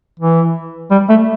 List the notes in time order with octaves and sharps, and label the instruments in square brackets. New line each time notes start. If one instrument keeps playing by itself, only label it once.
[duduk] E3
G3
A3